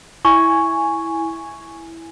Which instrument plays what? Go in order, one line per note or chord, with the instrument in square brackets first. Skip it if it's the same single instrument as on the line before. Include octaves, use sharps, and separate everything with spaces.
[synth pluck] E4 G#5 [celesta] C#6